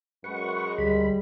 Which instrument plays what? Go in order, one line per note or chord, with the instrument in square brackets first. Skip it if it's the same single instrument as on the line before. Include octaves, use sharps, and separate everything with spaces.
[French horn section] F#2 G#3 [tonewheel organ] B4 F#5 C#6
[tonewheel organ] D2 B5 [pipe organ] G3 [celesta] G#4